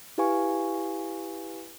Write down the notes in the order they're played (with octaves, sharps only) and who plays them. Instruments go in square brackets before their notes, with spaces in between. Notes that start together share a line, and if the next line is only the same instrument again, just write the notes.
[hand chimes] E4 G4 B4 F5 G#5 C#6